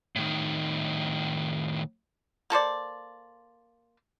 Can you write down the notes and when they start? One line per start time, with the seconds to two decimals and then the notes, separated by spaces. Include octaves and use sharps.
0.16 A2 D#3
2.50 A#3 A4 C5 D5